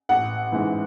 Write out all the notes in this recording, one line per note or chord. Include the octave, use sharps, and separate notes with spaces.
A1 F#5
G#2 E3